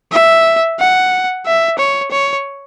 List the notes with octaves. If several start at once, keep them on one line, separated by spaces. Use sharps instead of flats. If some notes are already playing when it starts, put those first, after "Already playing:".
E5
F#5
E5
C#5
C#5